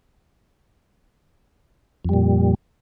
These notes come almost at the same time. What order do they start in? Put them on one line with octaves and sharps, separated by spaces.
F2 G3 A#2